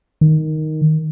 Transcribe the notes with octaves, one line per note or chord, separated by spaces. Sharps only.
D#3